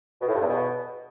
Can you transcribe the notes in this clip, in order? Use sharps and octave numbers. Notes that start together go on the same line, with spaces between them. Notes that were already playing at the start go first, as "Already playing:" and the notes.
B2
A2
G2
E2
B2